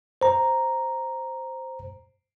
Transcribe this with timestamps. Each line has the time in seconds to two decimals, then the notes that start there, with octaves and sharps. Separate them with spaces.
0.21 C5 A#5